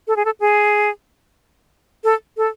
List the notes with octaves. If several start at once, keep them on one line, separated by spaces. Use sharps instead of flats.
A4
G#4
A4
G#4
A4
A4